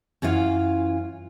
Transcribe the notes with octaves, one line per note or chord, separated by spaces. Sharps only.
F#2 E3 C#4 F4 F5